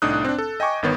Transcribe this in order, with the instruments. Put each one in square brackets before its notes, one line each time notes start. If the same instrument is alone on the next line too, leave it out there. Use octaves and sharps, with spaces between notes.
[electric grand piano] C2 A2 D4 D#4 D#6 F#6
C4 D4
A4
D#5 G5 G#5 C#6 D6
G1 D#3 B3 C#5